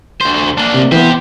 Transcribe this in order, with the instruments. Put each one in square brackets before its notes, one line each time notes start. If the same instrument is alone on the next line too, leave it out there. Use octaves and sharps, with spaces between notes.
[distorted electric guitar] D2 C5
A#3 D4
[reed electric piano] C3
[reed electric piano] E3 B3 [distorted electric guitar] G4 C5